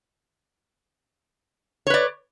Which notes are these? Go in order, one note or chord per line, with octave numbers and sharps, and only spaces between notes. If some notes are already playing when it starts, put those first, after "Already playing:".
B4 C#5 D5